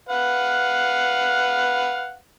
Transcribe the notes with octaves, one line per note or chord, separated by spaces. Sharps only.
B4 F5 F#5